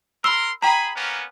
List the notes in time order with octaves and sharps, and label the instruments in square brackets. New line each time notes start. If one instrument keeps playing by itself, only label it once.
[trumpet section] A#4 C6 [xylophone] B5 E6
[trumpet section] G#4 B5 [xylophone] G5 A#5
[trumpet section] A#3 B3 C#4